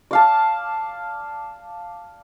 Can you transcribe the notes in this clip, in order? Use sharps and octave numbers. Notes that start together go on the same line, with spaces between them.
D5 F5 A5